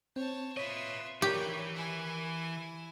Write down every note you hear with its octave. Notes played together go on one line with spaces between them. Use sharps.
C4 C#5 A5
F4 B4 C#5 D#5 E5
E3 G4 A#4 B4 C#5 D5 C#6
E4 G#5